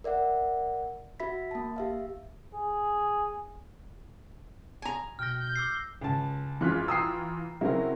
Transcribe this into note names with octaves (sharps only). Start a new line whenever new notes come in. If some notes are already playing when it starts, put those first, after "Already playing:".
A#4 D5 E5 F#5
F#4 E5 B5 B6
A#3 A5
G4 E5 F5
G#4
G#5 A#5
B2 G5 F6 A#6
G6
D6 E6 C7
C#2 A5
F#2 E3 G#3 F4 F#6 B6
G5 A#5 D#6 E6 C7
C#3 F#3 C4 E4 A#4